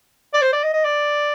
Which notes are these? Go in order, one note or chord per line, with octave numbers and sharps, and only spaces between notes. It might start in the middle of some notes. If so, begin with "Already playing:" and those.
D5
C5
D5
D#5
D#5
D5